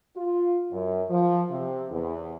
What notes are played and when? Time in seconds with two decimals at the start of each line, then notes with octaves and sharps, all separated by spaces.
0.16 F4
0.71 F#2
1.09 F3
1.49 C3
1.91 E2